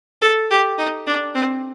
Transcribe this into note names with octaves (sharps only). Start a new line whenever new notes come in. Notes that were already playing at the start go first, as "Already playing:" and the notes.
A4
G4
D#4
D4
C4